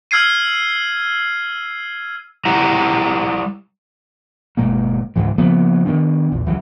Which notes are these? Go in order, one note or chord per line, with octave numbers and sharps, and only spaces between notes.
E6 F6 G#6 C7 D#7
G3 E4 F#5 A#5
G1 B2 G#3 A#3
C#2 G#2 E3
C#3 F3 A#3 B3
D#3 F3 B3 D4
A#1 E2
C#2 E3 F#3